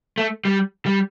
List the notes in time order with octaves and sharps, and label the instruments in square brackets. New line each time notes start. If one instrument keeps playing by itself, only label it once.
[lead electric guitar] A3
G3
G3